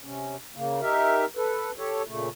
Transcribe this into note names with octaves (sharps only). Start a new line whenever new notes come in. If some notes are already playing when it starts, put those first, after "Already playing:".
C3 C#4
C#3 A#3
D#4 G4 A#4 E5
A4 B4
G4 A4 C#5
A#2 C#3 A3